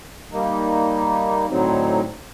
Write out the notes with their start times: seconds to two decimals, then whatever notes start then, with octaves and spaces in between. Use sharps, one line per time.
0.33 G3 A#3 D#4
1.50 A2 D3 F#3 C4 D#4